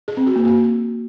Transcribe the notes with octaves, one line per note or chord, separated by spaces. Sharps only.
G#4
C4
F#4
A#3
F#4